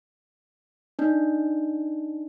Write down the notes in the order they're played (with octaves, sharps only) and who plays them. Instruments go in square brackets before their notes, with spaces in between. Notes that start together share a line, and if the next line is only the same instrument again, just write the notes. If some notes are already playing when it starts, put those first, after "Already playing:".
[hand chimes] D4 D#4